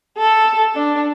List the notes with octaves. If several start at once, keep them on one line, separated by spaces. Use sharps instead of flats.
A4
D4